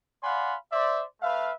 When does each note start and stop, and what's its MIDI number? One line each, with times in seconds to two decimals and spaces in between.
0.23 0.55 74
0.23 0.55 77
0.23 0.55 78
0.23 0.55 80
0.23 0.55 83
0.23 0.55 84
0.73 1.04 72
0.73 1.04 74
0.73 1.04 76
1.22 1.52 57
1.22 1.52 71
1.22 1.52 76
1.22 1.52 77